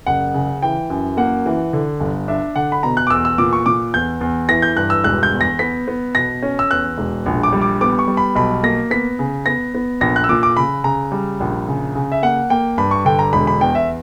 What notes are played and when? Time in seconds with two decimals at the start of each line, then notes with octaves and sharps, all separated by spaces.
0.06 F#1 F#5
0.34 C#3
0.62 E3 G5
0.90 F#2
1.17 A#3 F#5
1.46 E3
1.73 D3
2.00 G1
2.28 D4 E5
2.56 D3 F#5
2.72 B5
2.83 B2 A#5
2.97 F#6
3.07 D6
3.10 E2 E6
3.25 E6
3.38 A#2 D6
3.53 C#6
3.66 A#2 D6
3.94 E2 G6
4.21 E2
4.49 E3 A#6
4.62 G6
4.76 G2 F#6
4.90 E6
5.04 E1 F#6
5.23 G6
5.32 E2
5.41 A#6
5.59 B3 B6
5.88 B3
6.15 B2 A#6
6.42 C#4
6.59 E6
6.71 E2 F#6
6.98 E1
7.26 A#1
7.43 D6
7.53 G3
7.62 D6
7.81 B3 D6
7.99 C#6
8.08 G3
8.17 B5
8.35 B1 B5
8.63 A#3 A#6
8.91 B3 B6
9.19 C#3
9.46 B3 A#6
9.74 B3
10.01 A#1 A#6
10.16 F#6
10.24 E6
10.29 A#2 D6
10.43 D6
10.56 C#3 B5
10.84 C#3 A#5
11.12 G3
11.40 A#1
11.68 C#3
11.95 C#3
12.12 E5
12.23 A#3 F#5
12.50 A#3 G5
12.78 G2 B5
12.91 C#6
13.05 D3 G5
13.19 A#5
13.33 E1 B5
13.47 B5
13.61 E2 G5
13.75 E5